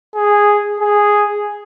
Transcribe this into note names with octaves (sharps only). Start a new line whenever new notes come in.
G#4
G#4